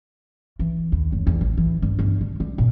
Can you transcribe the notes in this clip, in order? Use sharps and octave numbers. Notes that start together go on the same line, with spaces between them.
E3
D#2
F#1
E2
A1
E3
G2
G1
D3
G3
A#2